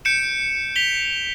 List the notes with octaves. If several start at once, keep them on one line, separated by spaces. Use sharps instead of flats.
G6 C#7 D7 E7
B6 F7 G7